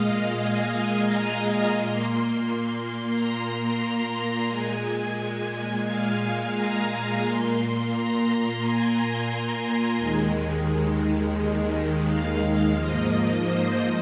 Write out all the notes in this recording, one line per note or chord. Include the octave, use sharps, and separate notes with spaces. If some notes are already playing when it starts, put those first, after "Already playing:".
Already playing: A#2 G#3 D#5 F5
G#5
G#5
A#5
A#2 A#3 C6
A#5
A#5
A#2 G#3 G#5
G#5
G#5
F5
G#5
A#5
A#2 A#3 C6
A#5
G#5
D#2 D#3 G#3
F5
G#2 F3 A#3 D#5
C5